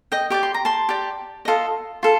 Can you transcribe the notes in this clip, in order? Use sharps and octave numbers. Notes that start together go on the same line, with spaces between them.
D#5 G5
G4 D5 D6
C6
A#5
A5 C6
G4 D5
F4 A4 D#5
F4 A4